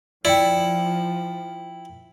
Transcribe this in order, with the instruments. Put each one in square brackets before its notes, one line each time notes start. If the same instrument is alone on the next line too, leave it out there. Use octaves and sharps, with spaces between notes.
[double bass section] F3 [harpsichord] E4 [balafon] D5 [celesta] G5 C#7 F#7